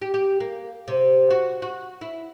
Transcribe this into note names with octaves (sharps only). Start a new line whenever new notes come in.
G4
G4
A#3
C3
F#4
F#4
E4